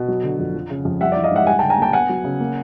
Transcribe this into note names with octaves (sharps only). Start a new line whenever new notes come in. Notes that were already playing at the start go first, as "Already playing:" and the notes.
Already playing: B2
F#3
D3
F2
F3
C#3
F2
G3 E5 F#5
D5 E5
E3
D#5 F5
G#2 E5 F#5
G3 F#5 G#5
G5 A5
D3
G#5 A#5
A#3 G5 A5
B3 F#5 G#5
F#3
C#3
A#3